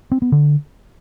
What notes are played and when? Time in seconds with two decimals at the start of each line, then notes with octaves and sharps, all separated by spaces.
0.12 C4
0.22 B3
0.32 D3